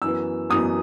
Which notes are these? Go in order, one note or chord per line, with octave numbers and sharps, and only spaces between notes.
F#2 E3 B3 E6
F#2 E3 B3 D#6